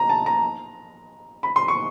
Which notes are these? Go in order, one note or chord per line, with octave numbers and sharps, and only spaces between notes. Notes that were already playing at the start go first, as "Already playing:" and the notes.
Already playing: A#5
A5
A#5
B5
C6
C#6